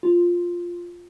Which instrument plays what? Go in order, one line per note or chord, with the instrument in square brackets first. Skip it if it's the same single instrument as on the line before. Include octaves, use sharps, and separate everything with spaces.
[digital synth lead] F4